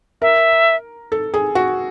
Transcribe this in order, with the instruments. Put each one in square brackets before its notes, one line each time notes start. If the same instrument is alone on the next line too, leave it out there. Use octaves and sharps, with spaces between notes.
[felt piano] A#4 [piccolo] E5
[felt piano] A4
G#4
F#4